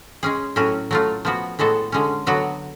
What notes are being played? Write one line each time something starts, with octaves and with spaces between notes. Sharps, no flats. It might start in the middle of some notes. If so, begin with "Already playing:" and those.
G#3 C#4 G#4
A2 F#3 C#4 F#4
F#3 A3 F4
F3 B3 F#4
A2 G#3 B3 F#4 A4
D3 G#3 C#4
D3 F#3 B3 F#4